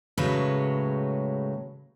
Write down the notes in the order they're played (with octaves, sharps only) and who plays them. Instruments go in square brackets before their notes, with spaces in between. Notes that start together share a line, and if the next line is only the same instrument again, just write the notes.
[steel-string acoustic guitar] A2 C#3 F#3 G#3 B4 C#5